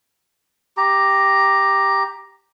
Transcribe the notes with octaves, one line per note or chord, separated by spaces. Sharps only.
G4 A#5